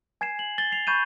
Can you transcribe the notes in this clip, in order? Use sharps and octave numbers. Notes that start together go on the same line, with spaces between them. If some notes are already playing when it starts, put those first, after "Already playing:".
G#5 G#6 C7 E7
F#7
A6 G7
G#5 C7 F7
B5 C#6 G6 G#6 D#7 E7